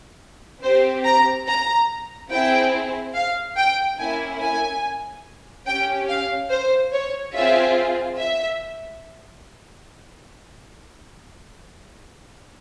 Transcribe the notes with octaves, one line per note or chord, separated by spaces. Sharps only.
C4 G4 C5
A#5
A#5
C4 E4 G#4 G5
F5
G5
A#3 C#4 E4 G#5
G#5
C#4 G4 G5
F5
C5
C#5
C4 F4 G#4 E5
E5